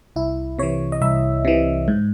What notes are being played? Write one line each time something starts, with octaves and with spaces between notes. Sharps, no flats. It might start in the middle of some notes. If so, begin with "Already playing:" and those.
C2 E4
C3 E3 C#5
D#5
C2 E5
C3 E3
G#2